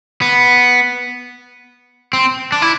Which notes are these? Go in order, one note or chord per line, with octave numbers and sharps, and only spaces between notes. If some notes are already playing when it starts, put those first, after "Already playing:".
B3
C4
D4
E4